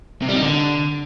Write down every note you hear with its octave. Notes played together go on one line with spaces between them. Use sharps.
C3
G3
D#4
D3